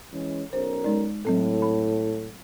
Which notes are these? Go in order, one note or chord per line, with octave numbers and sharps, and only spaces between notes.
E3 G#3 C#4
B1 C#4 A#4 C5
G#3 D#4 D5
A2 F#3 C4 A4
B5